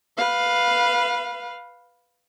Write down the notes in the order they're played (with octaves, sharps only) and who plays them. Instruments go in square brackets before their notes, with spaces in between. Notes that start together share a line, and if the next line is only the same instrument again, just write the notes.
[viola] B4 F5